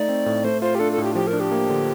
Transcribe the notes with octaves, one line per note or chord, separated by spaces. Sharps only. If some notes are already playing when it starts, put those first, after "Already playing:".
Already playing: A3 D#4 D5
C4
A2
A3 C5
F4 C5
G4
D4 A4
A4
A2
G4
F3 G4
A#4
D4
G4
A#3
D3